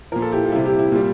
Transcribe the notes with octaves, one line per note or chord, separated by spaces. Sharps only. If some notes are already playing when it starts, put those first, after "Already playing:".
A#2 F3 A#4
A4
E4 G4
F4
C3 G3 E4
E4 G4
E4
A#2 G3